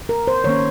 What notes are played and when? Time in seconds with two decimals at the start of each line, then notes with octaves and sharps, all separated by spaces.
0.09 A#4
0.28 C5
0.44 D#3 A#3 C#4 C#5